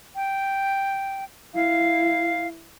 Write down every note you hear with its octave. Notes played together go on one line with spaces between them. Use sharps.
G5
E4 F5